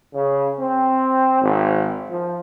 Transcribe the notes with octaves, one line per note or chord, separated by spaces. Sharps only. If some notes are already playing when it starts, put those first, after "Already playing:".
C#3
C4
G#1
F3